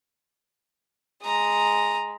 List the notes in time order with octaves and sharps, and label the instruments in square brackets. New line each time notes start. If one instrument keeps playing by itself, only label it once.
[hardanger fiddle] G#3 [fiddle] A#5 D#6